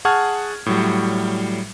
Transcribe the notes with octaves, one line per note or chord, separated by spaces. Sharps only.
G#4 F#5 A5 C#6 F6 G#6
A2 F#3 G3